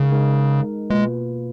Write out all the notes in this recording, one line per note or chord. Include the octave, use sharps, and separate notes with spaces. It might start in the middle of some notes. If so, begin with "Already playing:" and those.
Already playing: C#3 G#3 D#4 A#4
G#3 D#4 A#4
B2 G#3 A#3 F4 B4